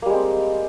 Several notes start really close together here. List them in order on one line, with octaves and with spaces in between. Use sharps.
A#3 G3 G#3 C4